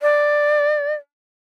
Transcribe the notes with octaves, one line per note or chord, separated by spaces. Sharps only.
D5